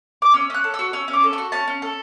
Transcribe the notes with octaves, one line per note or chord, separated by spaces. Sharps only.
D6
C#4 E6
C#4 F#6
A4
E6
F#4
C#4 E6
C#4
D6
A4
F#4 C#6
C#4 A5
C#4
A4